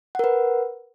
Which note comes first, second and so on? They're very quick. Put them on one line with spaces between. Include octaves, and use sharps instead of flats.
F#5 A#4 B4